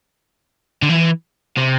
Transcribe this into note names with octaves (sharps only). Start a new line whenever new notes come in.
D3
E3
C3